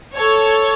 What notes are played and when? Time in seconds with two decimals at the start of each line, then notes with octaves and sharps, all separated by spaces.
0.16 A4 C#5